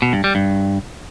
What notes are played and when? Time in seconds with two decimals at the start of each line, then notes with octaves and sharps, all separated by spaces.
0.02 B2
0.13 G2
0.24 G3
0.35 G2